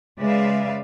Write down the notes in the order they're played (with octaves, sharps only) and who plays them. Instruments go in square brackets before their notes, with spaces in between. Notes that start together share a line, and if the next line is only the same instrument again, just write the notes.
[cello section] C#3 G#3 B4 D5 E5 F5